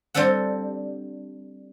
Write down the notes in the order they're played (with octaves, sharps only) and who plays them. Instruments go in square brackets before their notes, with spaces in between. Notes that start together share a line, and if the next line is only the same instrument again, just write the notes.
[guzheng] G3 C4 D4 A4 F#5